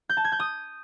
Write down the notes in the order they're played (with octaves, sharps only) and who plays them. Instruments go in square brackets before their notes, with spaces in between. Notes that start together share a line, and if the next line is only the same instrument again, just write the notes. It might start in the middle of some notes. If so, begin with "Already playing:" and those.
[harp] G6
A5
G#6
G6
D#6